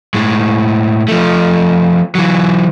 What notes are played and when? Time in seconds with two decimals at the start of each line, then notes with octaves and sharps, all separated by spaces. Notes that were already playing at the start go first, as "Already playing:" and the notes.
0.14 A2 G#3
1.08 F3 A3
2.15 E3 F#3